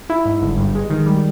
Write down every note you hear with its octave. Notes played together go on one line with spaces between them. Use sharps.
E4
G#2
G1
G2
G#3
D#3
G3